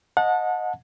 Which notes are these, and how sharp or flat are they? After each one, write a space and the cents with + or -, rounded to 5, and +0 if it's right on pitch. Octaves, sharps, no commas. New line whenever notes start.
D#5 +0 F#5 -30 A5 +0